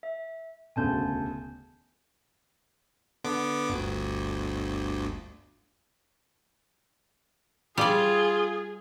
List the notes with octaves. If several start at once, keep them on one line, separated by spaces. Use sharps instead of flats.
E5
E1 D2 C#3 G#5 A5 G6
D3 B3 D6
G1 D2
G3 F4 G#4 D5